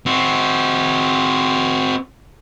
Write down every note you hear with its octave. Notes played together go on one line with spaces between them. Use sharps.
C4 F#4